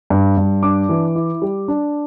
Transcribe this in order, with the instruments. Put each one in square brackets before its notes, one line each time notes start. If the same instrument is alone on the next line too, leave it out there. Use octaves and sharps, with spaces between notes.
[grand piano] G2
G2
D4 D6
E3
E4
G3
D4